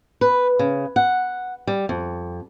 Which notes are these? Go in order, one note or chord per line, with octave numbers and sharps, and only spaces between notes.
B4
C#3
F#5
G3
F2